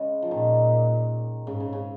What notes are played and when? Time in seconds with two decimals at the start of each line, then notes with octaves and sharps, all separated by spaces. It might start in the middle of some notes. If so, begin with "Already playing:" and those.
Already playing: C#3 G#3
0.22 F3
0.31 A#2 D#3
1.47 G#2 C#3
1.60 C#3
1.73 C#3